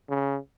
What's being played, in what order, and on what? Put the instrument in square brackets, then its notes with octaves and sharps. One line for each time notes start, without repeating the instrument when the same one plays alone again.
[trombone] C#3